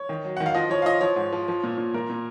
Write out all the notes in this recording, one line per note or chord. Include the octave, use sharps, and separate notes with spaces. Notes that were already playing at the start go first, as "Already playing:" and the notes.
Already playing: C#5
D#3
F#3
D#3 F#5
F5
F3 D#5
F3 C#5
F5
F3 D#5
F3 C#5
G#2
F3
F3
A#2
A#2
A#2 A#4
A#2